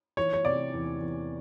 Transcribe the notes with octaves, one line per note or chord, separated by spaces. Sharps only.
E3 C#5
C#5
C3 D5
E2
E2